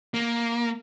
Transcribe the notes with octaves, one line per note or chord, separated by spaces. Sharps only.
A#3